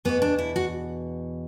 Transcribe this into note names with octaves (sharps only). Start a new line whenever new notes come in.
E2 B2 B3
D4
E4
F#4